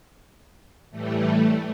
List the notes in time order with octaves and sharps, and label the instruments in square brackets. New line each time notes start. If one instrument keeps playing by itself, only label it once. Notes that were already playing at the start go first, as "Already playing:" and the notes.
[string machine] A2 E3 G3 A3